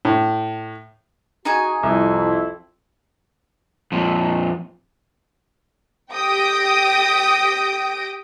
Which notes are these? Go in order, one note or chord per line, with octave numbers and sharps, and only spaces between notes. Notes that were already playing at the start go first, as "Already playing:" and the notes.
A2
D#4 F#4 G#4 G#5
C2 F2 E4
F2 A#2
G4 G5 D#6 A#6 D7